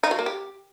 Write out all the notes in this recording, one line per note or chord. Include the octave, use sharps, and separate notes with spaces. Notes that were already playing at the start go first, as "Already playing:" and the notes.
D#4
F#3
A#3
G4